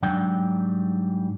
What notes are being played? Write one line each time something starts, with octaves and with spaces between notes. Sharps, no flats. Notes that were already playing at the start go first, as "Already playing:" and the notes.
G#2 F#3 G3 D4 G5